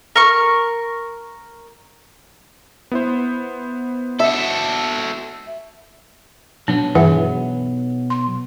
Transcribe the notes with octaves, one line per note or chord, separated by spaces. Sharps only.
A#4 C#6
B3 E4 C5
F#4 A4 E5
B1 F#3 B3 D4
G2 E3 G#4 E5 F#5
C6